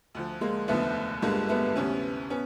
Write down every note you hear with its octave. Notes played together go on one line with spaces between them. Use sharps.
D2 D3 F3
G#3 A#3
F1 D#2 D3 F3 A3 B3
G1 G2 D3 G3 G#3 A#3
A3 B3
D2 C3 E3 B3 C#4
B3 C#4